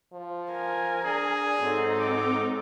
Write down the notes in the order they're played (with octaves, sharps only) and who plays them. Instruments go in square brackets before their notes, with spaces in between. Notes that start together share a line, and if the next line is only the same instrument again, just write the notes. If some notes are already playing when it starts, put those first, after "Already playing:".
[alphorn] F3
[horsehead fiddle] A#4 G#5
[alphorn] D4 [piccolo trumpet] G#4
[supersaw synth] G#2 D#4 [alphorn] F#3 [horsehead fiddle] C4 A4
[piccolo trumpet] D6